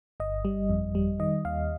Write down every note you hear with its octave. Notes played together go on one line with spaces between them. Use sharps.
G1 D#5
G3
F2
G3
D#3 D#5
D#2 F5